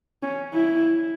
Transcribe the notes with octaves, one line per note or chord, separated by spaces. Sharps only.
C#4
E4